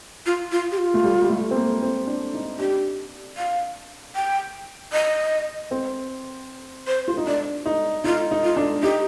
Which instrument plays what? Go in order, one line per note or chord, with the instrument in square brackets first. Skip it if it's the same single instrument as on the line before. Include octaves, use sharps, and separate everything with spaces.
[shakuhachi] F4
F4
G4
F4
[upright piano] A3
G3
G3
A3
C4
A#3
C4
D4
D#4
[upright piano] D4 [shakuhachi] G4
[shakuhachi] F5
G5
D#5
[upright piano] C4
[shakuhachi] C5
[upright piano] F4
D#4
[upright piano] D4 [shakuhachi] D5
[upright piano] D#4
[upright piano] D#4 [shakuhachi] F4
[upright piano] D#4
[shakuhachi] F4
[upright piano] D4
[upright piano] D#4 [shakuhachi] G4